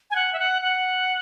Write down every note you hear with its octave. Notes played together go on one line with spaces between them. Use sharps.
G#5
F#5
E5
F#5
F#5